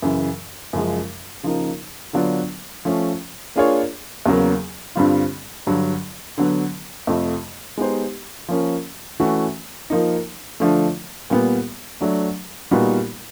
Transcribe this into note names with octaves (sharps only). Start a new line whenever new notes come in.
F#2 C#3 E3
F#2 C#3 F3 G#3
C#3 F3 A#3 D#4
D3 F#3 B3 D4 F4
F3 A3 C#4
A#3 D4 F4 G#4 C#5
E2 C#3 F#3 A#3
G2 D3 G3 C4 F4
G2 D3 F#3
D3 F#3 B3
F2 C3 F3 A3
G#3 B3 D#4 G4 C5
F3 A#3 C#4
E3 A3 C#4 F#4
F3 A#3 D#4
D3 F3 A3 D4
A#2 G3 B3
F#3 A3 D4
A#2 G3 B3 D#4 F#4